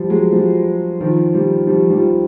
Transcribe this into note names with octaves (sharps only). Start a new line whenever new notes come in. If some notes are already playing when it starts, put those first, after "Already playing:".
Already playing: F3 G3
F#3 G#3
F3 G3
D#3 F3
F3 G3
F3 G3
F3 G3